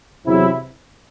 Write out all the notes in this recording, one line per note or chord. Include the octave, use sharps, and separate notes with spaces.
E2 C3 F#3 C4 E4